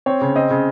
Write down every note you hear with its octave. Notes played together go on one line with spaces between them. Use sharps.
C4 C#5
C#3
C4 D#5
C#3